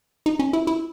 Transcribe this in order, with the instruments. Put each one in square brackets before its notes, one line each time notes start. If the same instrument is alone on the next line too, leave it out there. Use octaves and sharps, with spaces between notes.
[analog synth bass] D#4
C#4
E4
E4